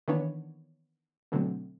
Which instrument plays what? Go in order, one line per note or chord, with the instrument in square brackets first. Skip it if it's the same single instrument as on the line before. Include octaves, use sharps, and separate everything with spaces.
[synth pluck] D#3 E3 A#3 B3 D4 C#5
B2 D3 F#3 A3 C4